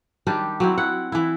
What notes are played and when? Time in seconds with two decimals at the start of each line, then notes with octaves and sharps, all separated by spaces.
0.27 D#3 G3 D4 G4
0.60 F#3 C4 E4
0.78 E4 F#5
1.12 E3 E4